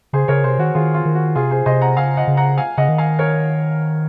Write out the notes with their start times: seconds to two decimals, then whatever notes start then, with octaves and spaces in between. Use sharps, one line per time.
0.13 C#3 G#4 C5
0.28 C#3 A#4 C#5
0.44 C3 G#4 C5
0.59 D#3 F#4
0.75 D#3 F4 G#4
0.94 F4
1.05 D#3
1.15 F#4
1.35 C3 F4 G#4
1.51 G#4 C5
1.66 C3 C5 D#5
1.81 F#5 A#5
1.96 C#3 F5 G#5
2.17 D#5 F#5
2.27 C#3
2.37 F#5 A#5
2.58 F5 G#5
2.77 C#3 D#5 F#5
2.89 D#3
2.98 F5 G#5
3.19 A#4 C#5